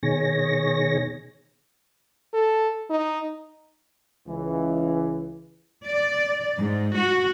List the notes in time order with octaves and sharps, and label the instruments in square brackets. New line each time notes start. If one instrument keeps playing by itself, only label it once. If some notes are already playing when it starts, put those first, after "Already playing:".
[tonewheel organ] B2 D#3 G#4 C#5 A#6
[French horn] A4
D#4
[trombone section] C#2 E3
[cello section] D5
G#2
F#4